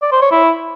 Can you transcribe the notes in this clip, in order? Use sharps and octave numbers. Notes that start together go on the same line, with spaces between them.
D5
C5
C#5
E4